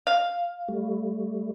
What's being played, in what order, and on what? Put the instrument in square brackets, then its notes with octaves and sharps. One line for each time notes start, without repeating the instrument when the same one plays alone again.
[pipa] F5
[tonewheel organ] G3 A3